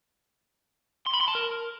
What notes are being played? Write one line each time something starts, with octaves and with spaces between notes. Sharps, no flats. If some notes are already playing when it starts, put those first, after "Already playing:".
C6
B5
C6
A5
A#4